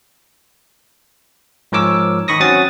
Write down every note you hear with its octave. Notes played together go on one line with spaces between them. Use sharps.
G#2 F3 A#4 C#5 D6 E6
D#3 B5 C#6 D#6 A#6
F#3 C4 C#4 F#5 D#6 A6